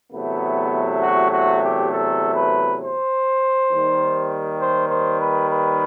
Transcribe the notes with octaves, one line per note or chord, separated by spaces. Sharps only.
E2 C3 F#3 A3 B3
F#4
F#4
G4
A4
B4
C5
D#2 D#3 G3
C5
C5
B4
B4